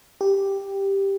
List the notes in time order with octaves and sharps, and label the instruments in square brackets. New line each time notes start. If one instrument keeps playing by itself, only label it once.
[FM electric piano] G4